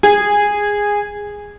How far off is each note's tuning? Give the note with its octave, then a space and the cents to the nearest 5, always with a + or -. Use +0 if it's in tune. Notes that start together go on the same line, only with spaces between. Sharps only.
G#4 -15